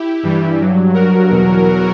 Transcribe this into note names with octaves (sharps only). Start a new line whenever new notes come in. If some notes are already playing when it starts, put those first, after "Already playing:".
Already playing: E4 G4
G2 E3 G3
G2 F#3
G2 F#3 F#4 A#4
E2 B2 F#3